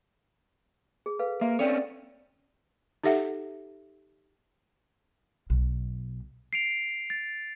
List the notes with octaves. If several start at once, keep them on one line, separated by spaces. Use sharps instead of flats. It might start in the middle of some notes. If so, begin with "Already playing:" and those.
G#4
A4 B4 F5
A#3 E5 F5 C6
C4 C#4 A4 C#5 D5 F#5 G5
D#4 G4 A4 E5 F#5
B1
C7 D7 F7
A6